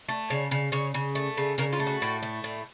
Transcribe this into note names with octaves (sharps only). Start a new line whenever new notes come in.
A3
C#3 C#5
C#3
C#3 C#5
C#3
A3
C#3
C#3 A#4
F4
A3
F#4
A2
A3
A2